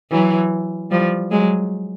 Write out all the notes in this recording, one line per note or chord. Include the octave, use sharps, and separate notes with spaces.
E3 F#3
F3 G3
F#3 G#3